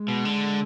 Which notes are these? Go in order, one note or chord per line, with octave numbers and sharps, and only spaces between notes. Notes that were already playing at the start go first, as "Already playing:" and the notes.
Already playing: G#3
B2
D3